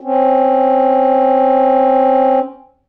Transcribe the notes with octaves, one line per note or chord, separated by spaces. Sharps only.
C4 C#4